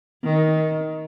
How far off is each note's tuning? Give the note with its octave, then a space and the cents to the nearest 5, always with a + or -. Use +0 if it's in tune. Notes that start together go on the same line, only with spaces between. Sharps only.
D#3 +15